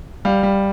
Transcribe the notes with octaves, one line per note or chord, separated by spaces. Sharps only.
G3 F5
G3